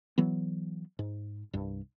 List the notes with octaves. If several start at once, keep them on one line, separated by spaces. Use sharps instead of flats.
E3 F#3 B3
G#2
C2 G2